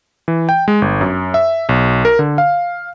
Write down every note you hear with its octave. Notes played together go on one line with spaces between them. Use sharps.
E3
G5
G#3
G1
F#2
E5
B1
A#4
D3
F5